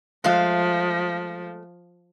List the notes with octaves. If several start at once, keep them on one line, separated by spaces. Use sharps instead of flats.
F3 G#3 A3 F5